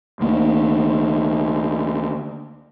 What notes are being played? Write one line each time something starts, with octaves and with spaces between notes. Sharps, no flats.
D2 A#3